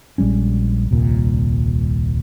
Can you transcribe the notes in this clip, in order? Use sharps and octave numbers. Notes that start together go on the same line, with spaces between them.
A#1 G3 G#3 C#4
D#1 C2 A#2